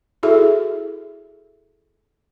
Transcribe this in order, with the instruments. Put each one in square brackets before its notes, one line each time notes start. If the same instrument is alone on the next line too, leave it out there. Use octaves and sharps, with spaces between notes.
[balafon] E4 F#4 G#4 A4 E5